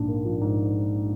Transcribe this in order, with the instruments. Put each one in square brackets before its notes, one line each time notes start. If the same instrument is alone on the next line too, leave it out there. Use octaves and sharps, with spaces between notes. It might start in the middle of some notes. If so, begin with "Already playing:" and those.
Already playing: [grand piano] A#1 G#2 D4
A#3
F3
G#2